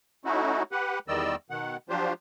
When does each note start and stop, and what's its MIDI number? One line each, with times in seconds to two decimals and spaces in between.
0.25 0.63 57
0.25 0.63 61
0.25 0.63 63
0.25 0.63 64
0.25 0.63 66
0.72 0.99 67
0.72 0.99 71
0.72 0.99 78
1.08 1.35 40
1.08 1.35 51
1.08 1.35 55
1.08 1.35 74
1.08 1.35 75
1.08 1.35 88
1.50 1.77 47
1.50 1.77 51
1.50 1.77 78
1.89 2.13 53
1.89 2.13 54
1.89 2.13 62
1.89 2.13 65
1.89 2.13 67
1.89 2.13 72